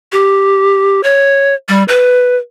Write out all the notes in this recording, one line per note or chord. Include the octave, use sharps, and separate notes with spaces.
G4
C#5
G3
B4